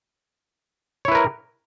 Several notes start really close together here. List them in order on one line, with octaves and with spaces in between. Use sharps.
C#5 E4 B4 A#4